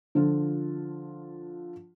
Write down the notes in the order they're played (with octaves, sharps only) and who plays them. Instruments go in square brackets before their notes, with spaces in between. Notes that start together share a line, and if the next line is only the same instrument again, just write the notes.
[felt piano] D3 F3 F4